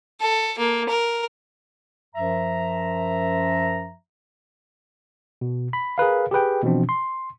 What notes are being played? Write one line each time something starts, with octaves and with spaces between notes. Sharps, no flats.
A4
A#3
A#4
F#2 F3 E5 A#5
B2
B5
G#4 A#4 B4 F5
G4 G#4 B4 G5
B2 E3 F3 C4 D4
C6